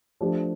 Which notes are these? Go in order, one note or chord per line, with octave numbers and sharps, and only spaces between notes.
F3 A3 D4 G4